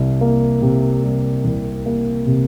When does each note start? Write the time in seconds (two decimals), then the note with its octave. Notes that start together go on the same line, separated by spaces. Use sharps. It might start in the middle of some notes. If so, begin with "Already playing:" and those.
Already playing: C2 G3
0.21 A#3
0.62 C3
1.03 G3
1.45 C2
1.86 A#3
2.27 C3